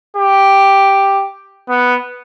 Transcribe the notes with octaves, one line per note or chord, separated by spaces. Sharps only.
G4
B3